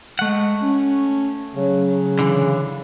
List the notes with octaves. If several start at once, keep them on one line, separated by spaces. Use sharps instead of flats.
G#3 A3 F#5
C#4
C#3 F#3
D3 E3